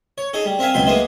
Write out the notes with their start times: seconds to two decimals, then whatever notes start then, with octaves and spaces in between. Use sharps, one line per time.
0.18 C#5
0.33 D#4 G#4 A4
0.46 G3
0.59 C4 A#4 E5 F5 G#5
0.74 C#2 B2 F#3 G5 B5 C6
0.87 G#3 A#3 B3 D#4 C5 E5